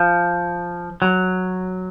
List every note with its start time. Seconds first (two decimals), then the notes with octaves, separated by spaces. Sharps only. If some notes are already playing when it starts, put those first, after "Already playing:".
Already playing: F3
1.02 F#3